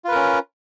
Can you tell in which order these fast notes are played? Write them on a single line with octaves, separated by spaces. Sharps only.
F4 B4 A#4 C#4